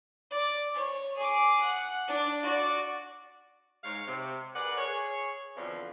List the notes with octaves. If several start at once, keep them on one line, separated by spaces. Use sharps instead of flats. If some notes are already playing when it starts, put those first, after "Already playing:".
D5
C#5
G#4 D6
F#5
D4
F#4 D5
G#2 G#3 C#5 F5
C3
G#4 A#4 B4 D5 F#5
G#4 C#5
F2 B2 D3 E3 F3